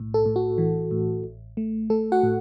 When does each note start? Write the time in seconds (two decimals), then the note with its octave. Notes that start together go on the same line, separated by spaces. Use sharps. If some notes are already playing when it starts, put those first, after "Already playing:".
Already playing: B1 A2
0.14 A4
0.26 A2
0.36 F#4
0.58 E3
0.91 A2
1.24 A1
1.57 A3
1.90 A3 A4
2.12 F#4 F#5
2.23 A2